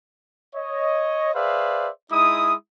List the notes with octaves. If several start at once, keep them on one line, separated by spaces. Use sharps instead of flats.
C#5 D#5
G#4 B4 C5 D5 E5 F5
G#3 D#4 E4 D#6